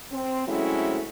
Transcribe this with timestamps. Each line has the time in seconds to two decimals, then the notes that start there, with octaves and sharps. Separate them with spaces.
0.12 C4
0.47 F#3 G#3 A3 C4 C#4 E4